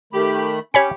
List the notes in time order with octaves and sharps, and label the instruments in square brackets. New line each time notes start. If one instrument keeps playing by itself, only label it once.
[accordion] D#3 A3 B5 [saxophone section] G4
[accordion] C#4 [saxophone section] G4 [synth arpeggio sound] C#5 B5 C#7 [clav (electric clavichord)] G#5